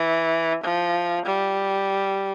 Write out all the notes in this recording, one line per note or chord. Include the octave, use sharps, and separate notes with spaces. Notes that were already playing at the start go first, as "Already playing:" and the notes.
Already playing: E3
F3
G3